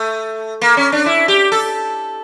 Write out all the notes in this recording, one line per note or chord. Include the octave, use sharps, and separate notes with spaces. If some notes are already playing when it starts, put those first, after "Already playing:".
Already playing: A3
A#3
C#4
D4
E4
G4
A4